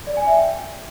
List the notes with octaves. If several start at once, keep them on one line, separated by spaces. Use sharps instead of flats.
D5
G#5
E5
G5